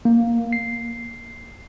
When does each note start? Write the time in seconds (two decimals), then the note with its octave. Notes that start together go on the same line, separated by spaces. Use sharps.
0.05 A#3
0.53 C7